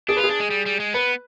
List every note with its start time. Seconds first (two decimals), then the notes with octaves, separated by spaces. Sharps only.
0.09 D4 G#4
0.16 F4 B4
0.24 G#4
0.29 D4
0.40 G#3
0.50 G3
0.66 G3
0.80 G#3
0.94 B3 B4